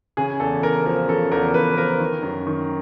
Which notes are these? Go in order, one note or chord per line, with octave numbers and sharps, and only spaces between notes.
C#3 G#4
E2 A4
E2 A#4
F3 A#4
C#3 A4
E2 A#4
E2 B4
F3 A#4
D#3
F#2
D#3